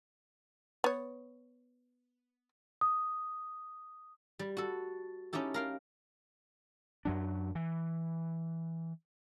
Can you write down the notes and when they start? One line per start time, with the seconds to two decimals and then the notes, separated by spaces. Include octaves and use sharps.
0.84 B3 C#5
2.81 D#6
4.39 G3
4.57 F#4 A4
5.33 C#4 D#4 E4 G4 A4
5.54 A#4 F5 G5
7.05 F#2 F#3 D4
7.55 E3